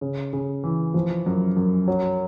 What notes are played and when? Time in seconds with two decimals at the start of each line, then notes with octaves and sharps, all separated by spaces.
0.01 C#3
0.33 C#3
0.64 E3
0.94 F3
1.26 F#2
1.57 F#2
1.88 F#3